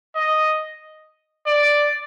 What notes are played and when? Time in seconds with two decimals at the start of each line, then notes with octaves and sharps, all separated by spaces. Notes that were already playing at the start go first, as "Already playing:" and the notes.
0.15 D#5
1.46 D5